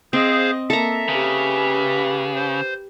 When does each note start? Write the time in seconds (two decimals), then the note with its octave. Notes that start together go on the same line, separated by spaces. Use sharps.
0.13 C4 G#4 C5 D#5 F5
0.70 A#3 A4 E5 A#5
1.08 C#3 G4 B4
2.35 C5